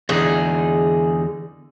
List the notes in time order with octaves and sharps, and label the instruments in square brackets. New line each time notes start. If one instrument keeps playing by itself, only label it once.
[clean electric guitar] E2 D3 D#4 [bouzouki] G#4